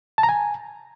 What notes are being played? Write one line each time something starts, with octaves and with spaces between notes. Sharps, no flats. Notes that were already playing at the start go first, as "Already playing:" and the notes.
A5
A#5
G#5